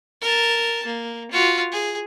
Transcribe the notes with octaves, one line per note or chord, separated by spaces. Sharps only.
A#4 A5
A#3
F4 F#4
G#4